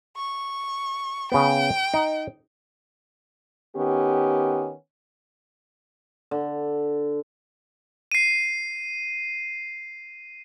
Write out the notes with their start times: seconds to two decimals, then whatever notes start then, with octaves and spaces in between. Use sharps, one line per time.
0.16 C#6
1.32 C#3 B3 G5
1.94 D#4
3.77 D#3 B3 C#4 G4
6.31 D3
8.12 C7 D#7